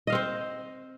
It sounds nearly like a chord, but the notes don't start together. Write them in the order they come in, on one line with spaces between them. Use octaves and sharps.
D#5 F5 C4 C5